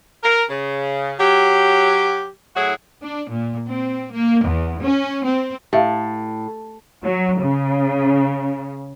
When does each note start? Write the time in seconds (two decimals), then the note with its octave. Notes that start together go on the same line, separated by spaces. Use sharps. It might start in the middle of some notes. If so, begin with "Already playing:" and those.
0.23 A#4
0.49 C#3
1.19 F#3 G4
2.56 A2 F#3 E4 F#4 G#4
3.02 D4
3.31 A#2
3.68 C4
4.13 A#3
4.44 E2
4.82 C#4
5.26 C4
5.73 A2 G4 E5 F5
7.03 F#3
7.40 C#3